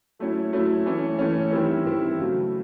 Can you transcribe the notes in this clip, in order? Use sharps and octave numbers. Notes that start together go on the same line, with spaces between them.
F#3 A3 C#4 E4
F#3 A3 C#4 E4
E3 A3 C#4
E3 A3 C#4
D#3 G3 C4 E4
D#3 G3 C4 E4
C#3 F#3 A3